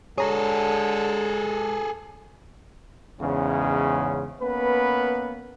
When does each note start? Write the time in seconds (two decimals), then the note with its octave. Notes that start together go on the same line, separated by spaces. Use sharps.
0.18 D3 G#3 G#4 A4 C#5 A#5
3.20 E2 G#2 C#3 C#4
4.40 A#3 B3 C#4 B4